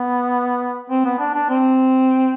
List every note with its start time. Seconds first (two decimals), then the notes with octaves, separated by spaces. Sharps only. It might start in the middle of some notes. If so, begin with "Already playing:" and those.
Already playing: B3
0.90 C4
1.05 B3
1.19 D4
1.34 D4
1.49 C4